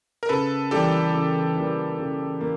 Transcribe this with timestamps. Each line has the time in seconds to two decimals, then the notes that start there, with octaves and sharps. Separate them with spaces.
0.23 A#4
0.29 C#3 A4 B4
0.71 E3 G3 A#3 G4 A4
1.14 C#3
1.56 E3 G3 A#3
1.99 C#3
2.41 A#3